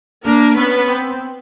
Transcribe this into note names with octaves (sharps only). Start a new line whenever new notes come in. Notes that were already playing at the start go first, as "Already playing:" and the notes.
A#3 D4 A#4
B3 C#4 B4
C4